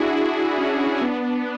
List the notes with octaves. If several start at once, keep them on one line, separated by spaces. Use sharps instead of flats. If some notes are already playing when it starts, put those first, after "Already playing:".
Already playing: D4 E4 F#4 G#4
D4 F#4
C#4 E4
C#4
B3 D4